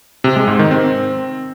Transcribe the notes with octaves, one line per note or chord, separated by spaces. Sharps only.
C3
G#3
G#2
D#3
C4